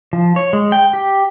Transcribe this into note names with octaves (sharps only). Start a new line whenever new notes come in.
F3
C#5
G#3
G5
G4